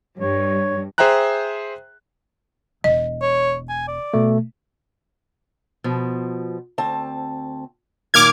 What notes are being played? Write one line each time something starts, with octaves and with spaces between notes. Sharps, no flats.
G2 C#5
G#4 C5 E5 G5 A#5 F#6
E1 D#5
C#5
G#5
D5
B2 A3
B2 F3
D2 C4 A5
F#2 A#2 D#3 D6 F6 G#6